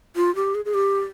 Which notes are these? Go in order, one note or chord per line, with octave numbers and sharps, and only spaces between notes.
F4
G4
G#4
G#4
G4